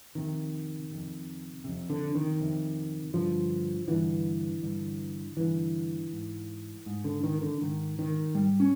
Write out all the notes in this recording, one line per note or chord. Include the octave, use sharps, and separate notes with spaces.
F2 C3 D#3
F2 C3
F2 C3
D3
D#3
F2 C3
G2 D3 F3
G2 D3 E3
G2 D3
G2 D3 E3
G#2
G#2
D3
D#3
D3
G#2 D#3
D#3
G#2 G3
C#4